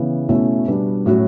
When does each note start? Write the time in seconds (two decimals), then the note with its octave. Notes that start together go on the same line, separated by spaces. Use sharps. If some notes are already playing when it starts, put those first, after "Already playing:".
Already playing: C#3 E3 B3
0.29 B2 A3 C#4 E4
0.68 B2 G3 B3 D4
1.06 A2 F#3 C#4 F#4